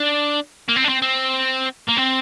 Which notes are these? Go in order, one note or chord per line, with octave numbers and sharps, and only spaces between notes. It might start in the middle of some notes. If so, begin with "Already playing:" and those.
Already playing: D4
A#3
C4
D4
C4
C4
A#3
C4